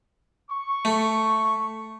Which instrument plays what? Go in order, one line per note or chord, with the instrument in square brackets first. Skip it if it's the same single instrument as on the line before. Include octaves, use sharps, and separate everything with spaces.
[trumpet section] C#6
[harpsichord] A3